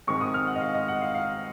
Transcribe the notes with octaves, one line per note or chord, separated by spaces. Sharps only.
G#2 D#3 G#3 C4 C#6
D#6
F6
F#5
D#5
F5
D#5
F#5
F5
F5